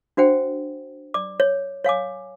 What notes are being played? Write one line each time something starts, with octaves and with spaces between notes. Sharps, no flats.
D4 F#4 C5 F#5 G5
D5 D6
C#5
C#5 F5 G#5 D6